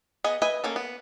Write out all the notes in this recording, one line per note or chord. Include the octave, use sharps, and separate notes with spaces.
B3 G#4 D#5
B4 D#5 E5 G#5
A#3 C#4 A4
B3